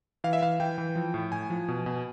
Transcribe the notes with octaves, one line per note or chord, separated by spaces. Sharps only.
E3 F5
E5
E3 F5
E3 G5
E3
F3
A2
A2 G#5
F3
B2
B2